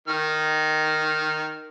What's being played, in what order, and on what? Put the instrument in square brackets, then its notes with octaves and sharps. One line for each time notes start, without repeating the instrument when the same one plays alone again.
[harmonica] D#3 F6